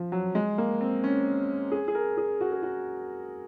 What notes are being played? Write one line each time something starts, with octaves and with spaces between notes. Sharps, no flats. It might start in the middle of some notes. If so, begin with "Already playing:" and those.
Already playing: F3
F#3
G#3
A#3
C4
C#4
G#4
G#4
A#4
G#4
F#4
G#4
F#4